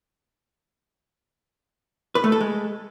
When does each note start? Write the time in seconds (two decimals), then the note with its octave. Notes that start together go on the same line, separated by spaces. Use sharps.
2.15 B4
2.24 A3
2.32 A4
2.40 G#3